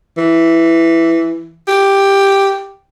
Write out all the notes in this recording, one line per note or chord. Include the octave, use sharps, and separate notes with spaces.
E3
G4